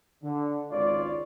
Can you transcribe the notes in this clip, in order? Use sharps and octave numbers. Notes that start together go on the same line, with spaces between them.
D3
G#1 C#2 F4 C#5 D5